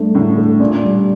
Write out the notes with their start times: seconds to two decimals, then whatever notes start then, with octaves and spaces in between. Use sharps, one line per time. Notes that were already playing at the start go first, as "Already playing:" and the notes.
Already playing: G2 A3 D4
0.15 A2 D3
0.38 A4
0.60 A#2 D4
0.83 G3